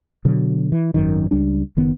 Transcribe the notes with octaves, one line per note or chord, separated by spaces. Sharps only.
B2 D3 F#3
E3
G#1 F#2 D#3
C#2 G3 D4
F#1 D#3 B3